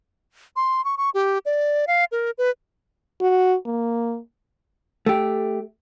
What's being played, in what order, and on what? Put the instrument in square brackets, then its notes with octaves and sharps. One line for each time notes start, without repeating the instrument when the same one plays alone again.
[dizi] C6
C#6
C#6
G4
D5
F5
A#4
B4
[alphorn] F#4
A#3
[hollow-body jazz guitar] A3 G4